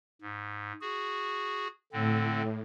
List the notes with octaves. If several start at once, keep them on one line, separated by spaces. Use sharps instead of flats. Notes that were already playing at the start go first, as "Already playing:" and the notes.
G#2
F#4 G#4
A2 D3 C4